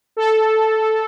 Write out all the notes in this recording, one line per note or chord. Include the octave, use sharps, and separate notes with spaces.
A4